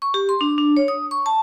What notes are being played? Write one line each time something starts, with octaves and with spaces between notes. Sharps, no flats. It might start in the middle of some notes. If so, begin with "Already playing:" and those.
C#6
G4
C6
D4
D4
C#5
D#6
C#6
A5